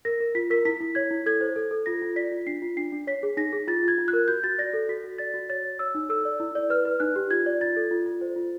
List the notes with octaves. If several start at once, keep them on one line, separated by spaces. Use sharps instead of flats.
A#4 A#6
A#4
F4 B6
A#4 B6
E4 B6
E4
C#5 G#6
E4
A4 G#6
C5
A4
A4
F4 A#6
F4
D5 B6
F4
D4 C7
F4
D4 C7
D4
C#5 B6
G#4
D#4 A#6
G#4
F4 A6
F4 G#6
F4
F#6
A#4
F#4 G6
F#4 A6
D5 A#6
A4
F#4 B6
F#4
D5 A6
F#4
C#5 A6
C#5
C#5 E6
D#4
A4 E6
D5
E4
D5
B4 F6
B4
D#4 F#6
G4
F4 G#6
D5
F4 A6
A4
F4
F4
C5
F4